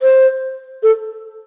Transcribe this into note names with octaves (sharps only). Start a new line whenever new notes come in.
C5
A4